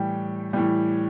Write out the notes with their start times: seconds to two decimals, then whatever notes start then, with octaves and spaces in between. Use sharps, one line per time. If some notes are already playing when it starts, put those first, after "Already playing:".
Already playing: A2 E3 G3 G5
0.53 A2 E3 G3